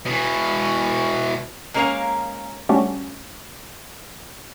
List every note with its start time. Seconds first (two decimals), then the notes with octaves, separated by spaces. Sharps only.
0.06 B2 E3
1.74 G#3 A#3 C#4 A#4 C#5 F5
2.69 G3 A3 C#4 D4 F#4 G4